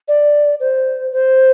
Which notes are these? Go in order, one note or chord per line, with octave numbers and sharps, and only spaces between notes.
D5
C5
C5